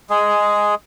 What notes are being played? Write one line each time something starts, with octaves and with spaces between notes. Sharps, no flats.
G#3 G#4